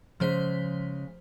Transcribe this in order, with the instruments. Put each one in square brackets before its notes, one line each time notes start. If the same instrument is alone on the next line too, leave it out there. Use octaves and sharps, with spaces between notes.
[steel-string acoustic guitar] C#3 G#3 [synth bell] F3 C5 B6